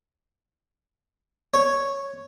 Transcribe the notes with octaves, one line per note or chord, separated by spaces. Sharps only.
C#5